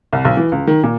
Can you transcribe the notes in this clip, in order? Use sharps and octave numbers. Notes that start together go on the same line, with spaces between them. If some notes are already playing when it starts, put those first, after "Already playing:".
C2
B1
E3
C#2
D#3
A#2